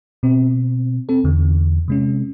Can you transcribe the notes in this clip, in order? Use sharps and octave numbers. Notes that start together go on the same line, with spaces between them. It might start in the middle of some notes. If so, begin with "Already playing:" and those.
B2 C4
C4 A4
E2 D3
C3 G#3 C#4